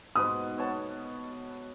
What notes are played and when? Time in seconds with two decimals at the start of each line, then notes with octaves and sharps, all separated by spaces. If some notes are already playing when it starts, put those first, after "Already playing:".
0.16 G#2 B2 B4 D#6
0.58 B3 C#5 A5